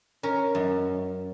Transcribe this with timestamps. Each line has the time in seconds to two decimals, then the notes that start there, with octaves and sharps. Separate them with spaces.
0.23 C#4 A#4
0.55 F#2